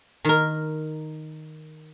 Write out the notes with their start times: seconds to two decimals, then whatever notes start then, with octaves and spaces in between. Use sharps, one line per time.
0.25 D#3 A#4